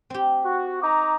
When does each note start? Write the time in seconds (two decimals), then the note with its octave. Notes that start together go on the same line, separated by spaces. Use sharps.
0.10 C4 G4
0.45 F#4
0.83 D#4 A#5 D6